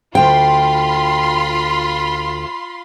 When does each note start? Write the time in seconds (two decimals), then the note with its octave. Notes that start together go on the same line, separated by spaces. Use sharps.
0.15 D2 F4 G5 B5 C6